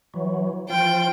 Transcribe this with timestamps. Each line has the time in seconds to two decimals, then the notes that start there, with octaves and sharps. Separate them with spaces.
0.14 E3 F#3
0.70 F3 F4 G5